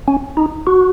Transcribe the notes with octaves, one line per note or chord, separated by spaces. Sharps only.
C#4
D#4
F#4